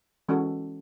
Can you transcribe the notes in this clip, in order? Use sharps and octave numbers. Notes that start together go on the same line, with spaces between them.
E3 G#3 C#4 F#4 A4